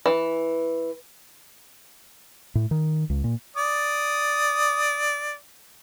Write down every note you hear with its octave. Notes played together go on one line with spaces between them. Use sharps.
E3
A2
D#3
C#2
A#2
D5 D#6